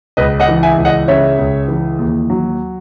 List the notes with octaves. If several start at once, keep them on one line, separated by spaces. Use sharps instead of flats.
C#2 B4 D#5
D#5 F#5
E3
E5 G#5
C#2
D#5 F#5
C#3 C#5 E5
C#2
E3
D#2
F#3